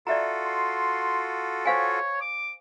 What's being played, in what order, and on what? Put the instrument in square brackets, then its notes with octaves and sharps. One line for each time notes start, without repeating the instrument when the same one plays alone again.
[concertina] F4 F#4 A4 [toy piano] D5 E5 A#5
[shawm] C6
[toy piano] C5 F5 G#5 [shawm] C#5
[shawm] D6